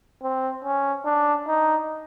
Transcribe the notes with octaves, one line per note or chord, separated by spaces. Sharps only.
C4
C#4
D4
D#4